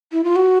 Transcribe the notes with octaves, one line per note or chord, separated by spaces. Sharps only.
E4
F4
F#4